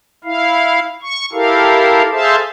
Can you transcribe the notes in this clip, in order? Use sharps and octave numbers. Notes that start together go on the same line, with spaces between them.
E4 F5
C#6
E4 G4 A4 A#4 F5
G#4 A4 C5 E5 F5 A5